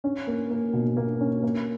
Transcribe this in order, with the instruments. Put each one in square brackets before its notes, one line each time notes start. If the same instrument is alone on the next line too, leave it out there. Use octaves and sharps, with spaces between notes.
[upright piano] C#4
A#3
A#3
B2
A#3
C#4
A#3